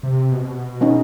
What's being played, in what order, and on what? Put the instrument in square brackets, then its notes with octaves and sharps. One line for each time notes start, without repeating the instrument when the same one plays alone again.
[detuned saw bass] C3
B2
[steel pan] B3 C#4 D#4